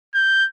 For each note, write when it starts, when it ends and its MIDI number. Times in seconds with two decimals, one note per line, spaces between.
0.14 0.46 91